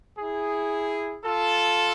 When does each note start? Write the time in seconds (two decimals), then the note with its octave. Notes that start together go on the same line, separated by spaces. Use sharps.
0.18 E4 G#4
1.24 F4 A4